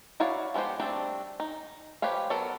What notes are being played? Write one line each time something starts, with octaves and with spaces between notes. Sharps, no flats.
E4 F#4 C#5 D5 F5
F3 G#3 B3 G4 C5
G3 A3 C4 D4
D#4
F3 G4 B4 C#5 F5
F#3 B3 F#4 A4 A#4